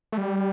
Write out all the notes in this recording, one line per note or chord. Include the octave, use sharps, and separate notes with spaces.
A3
G3